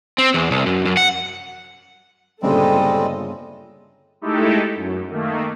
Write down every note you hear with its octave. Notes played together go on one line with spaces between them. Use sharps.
C4
E2
C2
F#2
F#2
F#5
G1 A#2 C#3 G3 G#3 C4 A4 D#5
G#3 A3 D#4 E4 G4 A4
F#2
D#3 A3 A#3